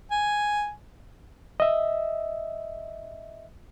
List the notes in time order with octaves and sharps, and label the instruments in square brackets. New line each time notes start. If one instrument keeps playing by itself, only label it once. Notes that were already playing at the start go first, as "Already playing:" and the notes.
[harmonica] G#5
[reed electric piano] D#5 E5